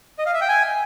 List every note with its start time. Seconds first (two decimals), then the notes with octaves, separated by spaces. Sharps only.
0.19 D#5
0.26 F5
0.34 E5
0.41 G5
0.49 G#5